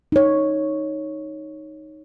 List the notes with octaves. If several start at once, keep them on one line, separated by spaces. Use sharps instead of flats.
D#4 C#5